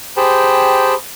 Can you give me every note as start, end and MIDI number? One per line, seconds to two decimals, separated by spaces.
0.17 0.94 67
0.17 0.94 68
0.17 0.94 72
0.17 0.94 79
0.17 0.94 81
0.17 0.94 83